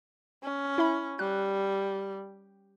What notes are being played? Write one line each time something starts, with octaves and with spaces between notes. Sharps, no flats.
C#4
E4 E5 B5
G3 F#6